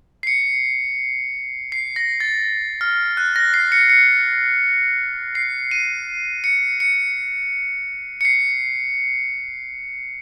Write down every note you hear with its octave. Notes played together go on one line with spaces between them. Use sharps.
C7
C#7
C7
A#6
A6
F6
F#6
A#6
C7
C#7
C#7
C7
D#7
C#7
C#7
C#7
C7